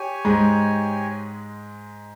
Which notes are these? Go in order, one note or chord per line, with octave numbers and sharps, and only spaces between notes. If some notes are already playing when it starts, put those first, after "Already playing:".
Already playing: G4 C#5 G#5
G#2 G#3